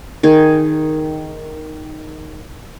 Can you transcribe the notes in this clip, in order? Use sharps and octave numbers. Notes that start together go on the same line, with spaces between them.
D#3 G#4